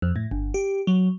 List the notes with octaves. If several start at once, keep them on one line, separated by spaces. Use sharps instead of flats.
F2
A2
G1
G4
F#3